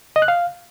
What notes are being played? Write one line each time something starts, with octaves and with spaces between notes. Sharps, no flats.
D#5
F#6
F5